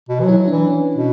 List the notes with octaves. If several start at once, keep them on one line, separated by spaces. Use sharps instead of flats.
B2
E3
F#3 E4
F#3
E3 D4
C#4
B2